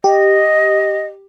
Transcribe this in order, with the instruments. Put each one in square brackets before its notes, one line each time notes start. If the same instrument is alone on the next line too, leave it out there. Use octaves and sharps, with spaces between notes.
[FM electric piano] G4 [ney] D#5